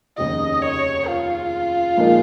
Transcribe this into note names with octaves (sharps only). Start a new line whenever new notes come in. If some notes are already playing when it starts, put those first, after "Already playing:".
F1 D#2 C#3 D#5
C#5
F4
A#2 F3 G#3 D#4 A#4